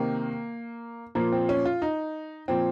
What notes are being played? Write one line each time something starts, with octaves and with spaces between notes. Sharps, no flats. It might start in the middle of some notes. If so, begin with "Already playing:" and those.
Already playing: C3 D#3 A#3
A#2 F3 A#3
C4
C#4
F4
D#4
A#2 F3 C4